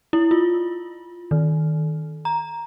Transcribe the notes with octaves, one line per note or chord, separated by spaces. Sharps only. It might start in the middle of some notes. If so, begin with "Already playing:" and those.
E4
F4
D#3
A#5